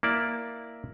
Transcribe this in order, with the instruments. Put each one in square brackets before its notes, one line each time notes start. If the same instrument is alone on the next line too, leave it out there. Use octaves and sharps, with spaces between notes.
[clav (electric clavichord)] A#3 E4 D5